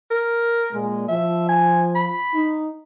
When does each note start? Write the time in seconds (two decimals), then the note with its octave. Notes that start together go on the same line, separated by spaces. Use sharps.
0.11 A#4
0.72 A#2 G#3
1.09 F3 E5
1.49 G#5
1.95 B5
2.34 D#4